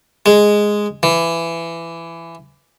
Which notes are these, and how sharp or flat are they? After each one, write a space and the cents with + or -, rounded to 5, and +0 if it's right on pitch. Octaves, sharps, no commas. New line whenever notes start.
G#3 -5
E3 +20